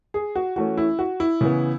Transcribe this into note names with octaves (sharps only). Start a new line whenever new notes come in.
G#4
F#4
E3 A3 C#4 F#4
E4
F#4
E4
C#3 E3 B3